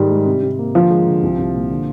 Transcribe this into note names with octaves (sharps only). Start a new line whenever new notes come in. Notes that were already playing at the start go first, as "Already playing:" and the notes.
Already playing: G#2 D#3 G3
G#3
C3
C3
A#3
D3 F3
G#3
D3
C2
C2
A#2
D3